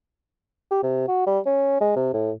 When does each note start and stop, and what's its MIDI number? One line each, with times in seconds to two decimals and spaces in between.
0.71 0.79 67
0.83 1.03 48
1.08 1.23 66
1.26 1.39 55
1.46 1.78 61
1.81 1.94 56
1.96 2.10 48
2.13 2.31 45